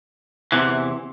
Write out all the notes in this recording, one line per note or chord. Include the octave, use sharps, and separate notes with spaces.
E2 C3 E3